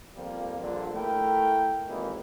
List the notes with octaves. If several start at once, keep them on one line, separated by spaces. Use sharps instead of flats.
F2 F3 G3 A#3
A#1 G2 A#2 D3
A3 E4 A4 A#4 G5
G#1 D#2 E3 A#3 D#4